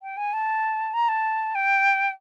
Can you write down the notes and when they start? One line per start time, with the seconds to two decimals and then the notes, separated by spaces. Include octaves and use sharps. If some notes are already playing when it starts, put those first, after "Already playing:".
0.02 G5
0.17 G#5
0.33 A5
0.93 A#5
1.08 A5
1.55 G5